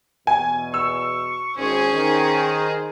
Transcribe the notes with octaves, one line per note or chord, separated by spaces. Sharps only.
E2 B2 G#5
C#6 E6
G#1 C#4 G#4 C5
D#3